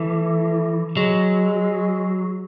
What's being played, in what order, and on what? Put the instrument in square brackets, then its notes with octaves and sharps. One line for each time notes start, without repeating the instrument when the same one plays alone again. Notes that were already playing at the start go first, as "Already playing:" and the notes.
Already playing: [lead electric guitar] E3 [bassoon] A3
[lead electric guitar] F#3 [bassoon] G#3